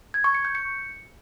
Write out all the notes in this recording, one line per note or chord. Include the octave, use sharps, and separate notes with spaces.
G#6
C#6
C#7
G6
C#7